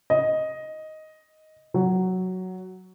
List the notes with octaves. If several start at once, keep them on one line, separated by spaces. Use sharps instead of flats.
D#5
F#3